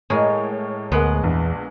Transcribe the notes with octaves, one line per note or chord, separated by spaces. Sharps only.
A2 G#3 A#3 C#5
D2 G#3 B3 F#5 C6
A#1 E2